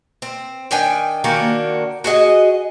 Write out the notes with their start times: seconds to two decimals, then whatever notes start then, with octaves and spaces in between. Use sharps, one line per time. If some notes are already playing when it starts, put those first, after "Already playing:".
0.22 C4
0.71 D#3 D4 G5 G#5
1.24 D#3 A#3 D4 F#4
2.04 F#4 G#4 D#5